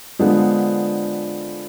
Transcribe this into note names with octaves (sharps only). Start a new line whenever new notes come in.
D3 F3 G#3 B3 D4